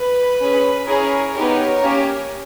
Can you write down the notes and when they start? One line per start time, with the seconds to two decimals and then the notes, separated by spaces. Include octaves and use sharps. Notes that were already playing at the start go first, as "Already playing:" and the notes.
Already playing: B4
0.41 C#4 G#4
0.88 C#4 E4 G#4 A#4 C#5
1.35 B3 D#4 G4 A#4 C#5
1.83 A#3 C#4 G4